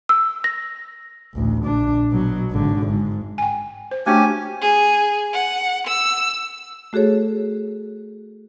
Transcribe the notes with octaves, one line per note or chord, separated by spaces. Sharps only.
E6
A#6
A1 D2
A#1 D4
B2 F#3
G#1 D3
G#2
G5 G#5
C5
A3 C#4 D4 F#4 G4 G#5
G#4
F#5
E6
A3 F#4 G#4 A4 C#5